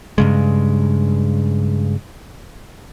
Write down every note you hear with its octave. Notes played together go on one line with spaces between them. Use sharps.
G2 C#3 G#3